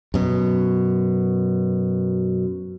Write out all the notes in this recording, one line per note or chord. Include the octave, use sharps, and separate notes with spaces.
F#2 B2